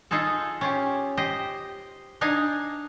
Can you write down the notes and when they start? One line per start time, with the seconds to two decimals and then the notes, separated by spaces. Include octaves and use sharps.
0.11 D#4 F4 G#4 A4
0.61 C#4 F4 G4
1.17 G4 C5 D#5
2.21 D4 D#4 F5 G#5 A#5